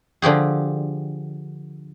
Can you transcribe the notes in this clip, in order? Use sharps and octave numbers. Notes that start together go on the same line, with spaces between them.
D3 F3 G4 G#4